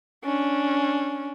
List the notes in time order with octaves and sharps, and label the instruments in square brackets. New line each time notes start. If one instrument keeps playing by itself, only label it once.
[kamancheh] C#4 D4